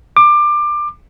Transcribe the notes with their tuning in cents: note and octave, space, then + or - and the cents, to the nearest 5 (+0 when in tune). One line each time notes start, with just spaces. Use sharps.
D6 +20